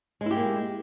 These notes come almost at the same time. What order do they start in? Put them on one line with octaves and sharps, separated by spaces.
G#3 E4 G4 A#3